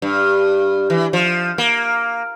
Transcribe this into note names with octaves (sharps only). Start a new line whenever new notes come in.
G2
E3
F3
A#3